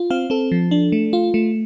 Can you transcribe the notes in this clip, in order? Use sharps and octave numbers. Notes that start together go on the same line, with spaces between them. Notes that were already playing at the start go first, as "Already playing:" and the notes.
Already playing: F4
C4 F5
C4 A4
F3
D4
A3
F4
A3